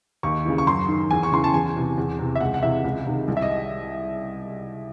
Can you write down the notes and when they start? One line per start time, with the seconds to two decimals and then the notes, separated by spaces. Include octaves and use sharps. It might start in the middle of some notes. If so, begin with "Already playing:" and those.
0.23 D#2 C#6
0.45 C#3 E3
0.58 C#6
0.67 F#2 C6
0.88 D#3
1.11 E2 G#5
1.23 C#6
1.32 C#3 E3 C6
1.44 A5
1.54 E2 G#5
1.76 C3 E3
1.98 E2
2.19 C3 E3
2.35 E5
2.40 C#2 F#5
2.54 F#5
2.63 C3 E3 E5
2.84 C#2
3.06 C3 D#3
3.28 C2
3.37 E5
3.42 D#5